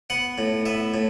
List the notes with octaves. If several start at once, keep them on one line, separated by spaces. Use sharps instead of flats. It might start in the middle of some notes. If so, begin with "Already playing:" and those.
B3 F#5
A2
B3 E5
A2